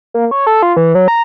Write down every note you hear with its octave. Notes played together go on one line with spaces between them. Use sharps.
A#3
C#5
A4
F4
E3
F#3
A#5